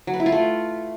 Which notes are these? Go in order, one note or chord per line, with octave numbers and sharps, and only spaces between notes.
F#3
B4
E4
F4
A3